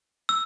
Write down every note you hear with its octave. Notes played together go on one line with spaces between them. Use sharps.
E6